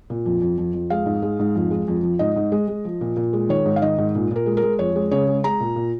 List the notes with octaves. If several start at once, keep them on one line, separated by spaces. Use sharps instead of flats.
A#2
F2
F2
F2
F2
G#3 F5
G#2
G#3
G#2
F2
G#3
F2
F3
G#2 D#5
G#2
G#3
G#3
F3
A#2
A#2
G#3
D#3 C#5
G#2
F5
D#3 D#5
G#2
A#2
A#2 A#4
G#3
A#4
G#3
F2 C#5
G#3
C#3 C#5
G#3
G#3 A#5
A#2
A#2